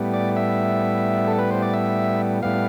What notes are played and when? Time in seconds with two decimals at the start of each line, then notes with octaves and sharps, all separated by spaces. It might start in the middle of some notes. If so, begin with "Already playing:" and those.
Already playing: A2 G3 B3
0.13 D5
0.36 E5
1.28 A4
1.39 B4
1.51 C5
1.62 D5
1.74 E5
2.43 A2 G3 B3 F5